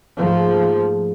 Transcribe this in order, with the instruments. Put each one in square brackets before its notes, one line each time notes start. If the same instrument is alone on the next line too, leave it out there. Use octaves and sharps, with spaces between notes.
[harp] G#2 A3 A#3 [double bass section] F3